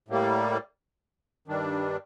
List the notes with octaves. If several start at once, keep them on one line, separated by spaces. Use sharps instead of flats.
A2 G3 A#3
G2 D#3 G3 D4